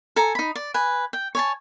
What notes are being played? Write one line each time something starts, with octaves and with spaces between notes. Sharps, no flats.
A4 G#5 A#5
D#4 B5
D5
B4 G#5
G5
C#5 G#5 A5